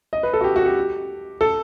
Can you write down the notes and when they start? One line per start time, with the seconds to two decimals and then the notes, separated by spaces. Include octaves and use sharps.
0.13 D#5
0.23 B4
0.33 A4
0.41 F#4
0.44 G4
0.56 F#4
0.66 G4
1.41 A4